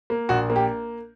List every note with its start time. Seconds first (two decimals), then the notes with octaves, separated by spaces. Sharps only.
0.10 A#3
0.29 A#1 F#4
0.50 A#3
0.56 G4